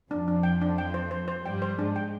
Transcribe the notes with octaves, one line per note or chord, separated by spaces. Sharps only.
F2 F3 D4
D4
G5
D4
G5
C5
C5
C5
G2 G3 G5
C5
G#2 G#3 D4
G5